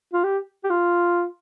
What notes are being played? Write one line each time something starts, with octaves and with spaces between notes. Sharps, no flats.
F4
G4
G4
F4